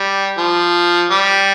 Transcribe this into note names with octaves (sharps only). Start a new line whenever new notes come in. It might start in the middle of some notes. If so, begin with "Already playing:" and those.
Already playing: G3
F3
G3